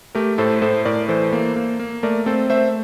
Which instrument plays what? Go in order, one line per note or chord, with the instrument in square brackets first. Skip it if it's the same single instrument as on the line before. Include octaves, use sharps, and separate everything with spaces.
[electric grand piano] A3 G4 A#4
A2 A4 C5
A2 A4 C5
A2 A#4 D5
E3 A4 C5
A#3
A#3
A#3
A3 A#4 D5
C4 A4 C5
A3 C5 E5